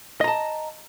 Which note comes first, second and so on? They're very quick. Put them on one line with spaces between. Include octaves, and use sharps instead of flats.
D#5 A#5 A5